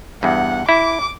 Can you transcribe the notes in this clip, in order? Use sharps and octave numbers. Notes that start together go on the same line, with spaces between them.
E2 G2 F#5
E4 D6